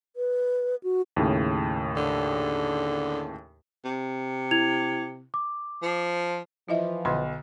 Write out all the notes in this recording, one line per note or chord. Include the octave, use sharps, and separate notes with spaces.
B4
F#4
D#2 A2 C#3
D3
C3
E4 G#6 F7
D6
F3
E3 F3 E4 D#5 E5
B1 D3 B5